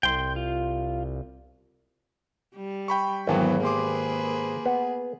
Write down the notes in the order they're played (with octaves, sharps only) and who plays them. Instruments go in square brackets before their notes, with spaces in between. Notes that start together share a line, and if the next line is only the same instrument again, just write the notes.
[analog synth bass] C2 [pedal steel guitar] G5 C6
[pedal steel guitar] F4
[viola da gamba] G3
[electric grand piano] G5 B5 C#6
[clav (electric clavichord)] G#1 [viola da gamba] E2 F#3 [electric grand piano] D3 E3 B3
[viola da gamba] A#3 G#4 B4 [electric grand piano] G4 C6 D6
[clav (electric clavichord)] B3